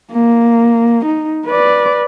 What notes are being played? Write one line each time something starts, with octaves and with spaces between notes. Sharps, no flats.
A#3
D#4
B4 D5